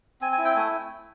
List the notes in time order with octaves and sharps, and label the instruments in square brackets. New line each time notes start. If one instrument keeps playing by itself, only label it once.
[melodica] C4 G#5
G#5
E4
G5
A3 G#5